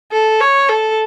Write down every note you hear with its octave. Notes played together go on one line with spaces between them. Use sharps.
A4
C#5
A4